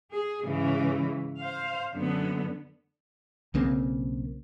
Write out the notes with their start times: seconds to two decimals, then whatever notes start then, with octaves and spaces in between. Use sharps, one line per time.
0.12 G#4
0.42 G#2 C#3 E3
1.39 C5 F5
1.92 F#2 D3 B3
3.54 B1 C#3 A#3 C4